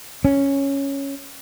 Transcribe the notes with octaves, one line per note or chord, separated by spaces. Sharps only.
C#4